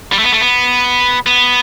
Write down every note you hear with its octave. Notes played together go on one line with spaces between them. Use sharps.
G3
A3
B3
A3
B3
B3